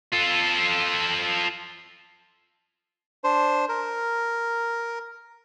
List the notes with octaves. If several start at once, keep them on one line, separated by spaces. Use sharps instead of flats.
F4 A4
D4 C5
A#4